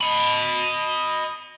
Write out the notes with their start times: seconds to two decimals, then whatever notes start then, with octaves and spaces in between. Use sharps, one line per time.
0.01 D#5 B5